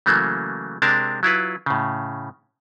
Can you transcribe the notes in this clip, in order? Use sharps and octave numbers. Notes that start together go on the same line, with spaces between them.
C#3 E3 F#3 A3 A#3
C3 G#3 C4 D4 A#4 A5
F#3 E4 F4 B4
A2 C#3